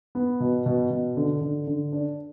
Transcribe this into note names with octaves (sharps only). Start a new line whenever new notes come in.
B3
B2
B2
B2
D3
D3
D3
D4